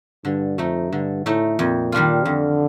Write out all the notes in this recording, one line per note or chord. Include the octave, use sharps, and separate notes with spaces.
G2 D3
F2 A3 D#4
G2 D3
A2 A3 D#4
F2 A#2
D#3 G3 D4 F4
F2 D3